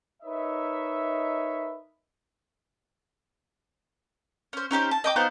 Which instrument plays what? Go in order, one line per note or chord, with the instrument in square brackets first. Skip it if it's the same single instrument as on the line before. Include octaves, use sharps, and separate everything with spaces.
[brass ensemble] D#4 A#4 B4 C#5 D#5 E5
[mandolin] C#4 C5
C#4 D#4 G4 C5
A5
D#5 G5 D6
B3 D#4 F4 C5